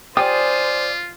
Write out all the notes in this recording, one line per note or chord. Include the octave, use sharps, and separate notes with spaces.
F4 G4 C5 D5 G#5 D#6